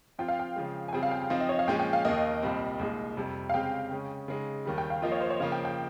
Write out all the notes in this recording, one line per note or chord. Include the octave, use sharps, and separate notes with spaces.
F3 C4 F4 G5
F5
G5
C#3 F3 G#3
G#5
C#3 G3 C4 F4 G#4 G5
F5
G5
G5
F3 C4 D#4 F5
D#5
C#5
F5
A#2 F3 G#3 C#4 G5
G5
F5
D#2 D#3 A#3 D#5
C2 A#2 G3 C4
C2 A#2 G#3 D#4
F2 C3 G3
F5
C#3 G#3 C4 G4 G5
C#3 G#3 C#4
C#3 G#3 D#4
D#2 D#3 G3
G5
F5
F3 A#3 F4 D#5
C#5
C5
C#5
C#3 F3 A#3 F5
G5
G5